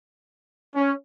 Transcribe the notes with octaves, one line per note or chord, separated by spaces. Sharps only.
C#4